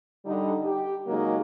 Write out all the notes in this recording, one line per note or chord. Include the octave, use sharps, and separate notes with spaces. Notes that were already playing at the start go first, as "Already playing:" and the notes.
D3 G3 D#4
G4
C#3 F#3 G#3 A#3 D#4